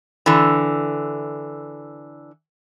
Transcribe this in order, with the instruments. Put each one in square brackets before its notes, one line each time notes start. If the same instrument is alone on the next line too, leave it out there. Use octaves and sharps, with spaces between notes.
[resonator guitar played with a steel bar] D3 E3